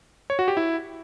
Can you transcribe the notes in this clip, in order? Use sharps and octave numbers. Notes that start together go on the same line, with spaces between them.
C#5
F#4
G4
E4